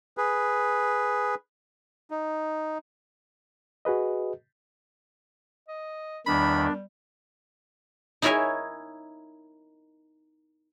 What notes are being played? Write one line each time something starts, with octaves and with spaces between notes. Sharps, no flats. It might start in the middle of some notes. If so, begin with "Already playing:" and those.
G#4 B4
D#4
F#4 G#4 B4 D#5
D#5
E2 D#3 G3 D4 B5
D#4 E4 A#4 C#5 E5 G#5